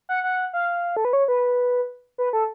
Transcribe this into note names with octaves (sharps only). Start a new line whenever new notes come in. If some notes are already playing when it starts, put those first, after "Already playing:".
F#5
F#5
F5
A4
B4
C#5
B4
B4
A4